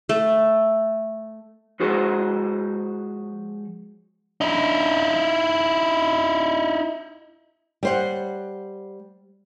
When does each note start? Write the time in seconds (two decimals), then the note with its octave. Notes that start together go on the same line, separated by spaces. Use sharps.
0.09 A3
1.80 F3 G#3 F#4 G#4 C5 D#5
4.41 D#4 E4
7.83 G3 C5 F#5